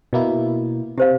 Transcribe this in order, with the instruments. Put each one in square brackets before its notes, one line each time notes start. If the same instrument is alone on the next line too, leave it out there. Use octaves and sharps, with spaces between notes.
[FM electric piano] B2 A#3 E4
[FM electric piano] C3 [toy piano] G4 C5 F5